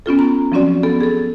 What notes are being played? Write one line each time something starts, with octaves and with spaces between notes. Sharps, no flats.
B3 C#4 F4 A4
A#5
F3 F#3 C4 C#4 F#4 D5
B3 A4
G#4 A4